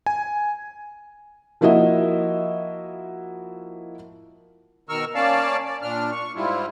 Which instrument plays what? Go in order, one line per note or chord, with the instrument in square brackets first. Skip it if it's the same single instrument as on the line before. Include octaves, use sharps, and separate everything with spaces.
[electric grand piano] G#5
[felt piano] F3 A#3 E4 F#4 D#5 E5
[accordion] B2 D#3 A#4 C#6 E6 F6
A#3 C#4 D5 F5 A5
D5
A#2 D4 F6
C#6
G#2 G3 E4 F4